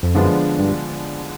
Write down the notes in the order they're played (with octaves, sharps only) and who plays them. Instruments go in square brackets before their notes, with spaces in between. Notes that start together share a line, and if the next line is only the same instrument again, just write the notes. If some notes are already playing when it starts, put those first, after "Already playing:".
[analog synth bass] F2
[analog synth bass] F#2 [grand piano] D3 F3 G#3 B3 D4
[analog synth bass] G2